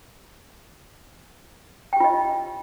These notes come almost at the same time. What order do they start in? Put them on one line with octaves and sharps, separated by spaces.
G5 G4 F4 D#5